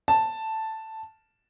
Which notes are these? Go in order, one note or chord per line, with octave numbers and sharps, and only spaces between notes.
A5